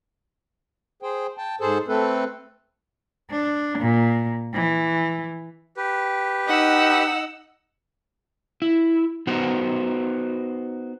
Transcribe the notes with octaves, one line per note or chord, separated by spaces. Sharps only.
G#4 C5 G5
G5 A5
G#2 G#4 A4 C5 A5
A3 C4 A4 B4
D4
A#2
E3
G4 B4
D#4 F#5 E6
E4
B3 D#4 F#4 C5